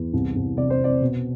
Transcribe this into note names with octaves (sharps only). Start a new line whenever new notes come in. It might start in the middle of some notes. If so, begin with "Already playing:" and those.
Already playing: E2
C2
C2
C3 D5
C5
C3 D5
B2